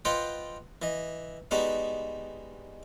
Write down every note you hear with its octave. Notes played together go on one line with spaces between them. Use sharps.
F4 B4 C5 D#5 F#5 G5
E3 D#5
G3 G#3 B3 D#4 F#4